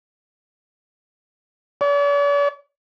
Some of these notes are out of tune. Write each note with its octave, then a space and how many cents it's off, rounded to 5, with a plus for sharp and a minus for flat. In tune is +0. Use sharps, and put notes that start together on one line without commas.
D5 -45